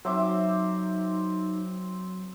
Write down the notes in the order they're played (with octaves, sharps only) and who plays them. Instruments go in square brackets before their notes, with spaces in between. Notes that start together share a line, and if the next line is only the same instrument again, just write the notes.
[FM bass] F#3 [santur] C4 E5 D6 [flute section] D#4